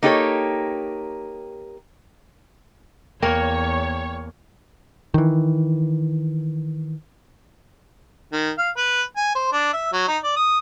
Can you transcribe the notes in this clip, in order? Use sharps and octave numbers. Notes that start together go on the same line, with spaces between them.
A#3 D#4 G4 A4 A#4 C#5
E2 A#3 A#4 C#5 G5 F6 F7
D#3 E3
D#3
F5
B4
G#5
C5
D4
E5
F#3
D#4
D5
D#6